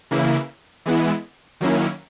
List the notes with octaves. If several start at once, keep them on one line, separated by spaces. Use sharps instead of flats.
C#3 E3 A#3 E4
E3 G#3 B3 E4
D#3 F#3 A#3 C#4 E4